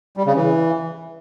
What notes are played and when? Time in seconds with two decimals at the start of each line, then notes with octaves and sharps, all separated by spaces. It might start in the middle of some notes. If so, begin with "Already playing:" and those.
0.17 G3
0.26 C#3
0.36 E3